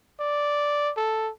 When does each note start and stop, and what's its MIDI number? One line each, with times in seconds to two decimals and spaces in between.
0.20 0.91 74
0.97 1.30 69